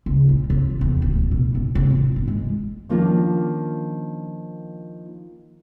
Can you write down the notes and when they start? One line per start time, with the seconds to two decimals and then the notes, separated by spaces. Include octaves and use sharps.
0.06 C#2
0.29 A#1
0.50 C3
0.81 E2
1.02 D1
1.31 B2
1.55 G#1
1.75 C3
1.90 A1
2.16 G1
2.28 G#3
2.89 D#3 F3 A#3 C#4 D4 F4